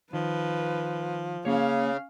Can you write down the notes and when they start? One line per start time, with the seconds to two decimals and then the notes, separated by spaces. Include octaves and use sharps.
0.13 D#3 F3 B4
1.45 C#3 A#3 C#4 C#5 F5